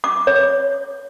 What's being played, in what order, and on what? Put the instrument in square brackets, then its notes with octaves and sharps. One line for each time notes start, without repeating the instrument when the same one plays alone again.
[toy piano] D6
C#5